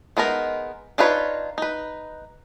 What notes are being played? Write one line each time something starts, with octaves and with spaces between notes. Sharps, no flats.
G#3 B3 D#4 A#4
D4 D#4 F4 B4 C#5
D#4 B4